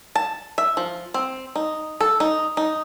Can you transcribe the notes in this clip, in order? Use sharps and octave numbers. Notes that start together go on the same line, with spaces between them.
A5
E5
F3
C4
D#4
A4
D#4
D#4